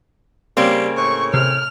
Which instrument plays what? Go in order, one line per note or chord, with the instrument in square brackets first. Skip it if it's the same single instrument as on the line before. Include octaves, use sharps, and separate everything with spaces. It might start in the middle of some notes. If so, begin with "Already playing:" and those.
[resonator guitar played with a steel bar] C#3 A#3 C4 [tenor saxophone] G3
[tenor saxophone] A2 [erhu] C#6
[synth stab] C3 [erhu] F6